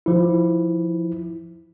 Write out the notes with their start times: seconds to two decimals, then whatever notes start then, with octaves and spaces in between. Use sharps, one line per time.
0.06 F3 E4